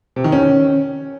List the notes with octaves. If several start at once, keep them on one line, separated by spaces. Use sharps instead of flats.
C3
D#3
C#4